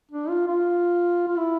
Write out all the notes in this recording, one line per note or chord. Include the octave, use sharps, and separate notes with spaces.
D4
F4
F4
F4
E4